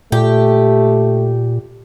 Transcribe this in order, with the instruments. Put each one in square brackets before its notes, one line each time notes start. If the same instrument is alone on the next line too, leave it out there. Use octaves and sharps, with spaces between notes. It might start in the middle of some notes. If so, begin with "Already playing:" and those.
[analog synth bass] A#2 [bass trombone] A3 [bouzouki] G4